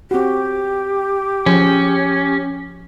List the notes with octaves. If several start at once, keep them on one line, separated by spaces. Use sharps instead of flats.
C4 F#4 G4
F3 C#4 G#4